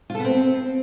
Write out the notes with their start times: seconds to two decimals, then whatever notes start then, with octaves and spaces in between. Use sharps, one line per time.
0.10 F4
0.15 A4
0.20 B3
0.25 C4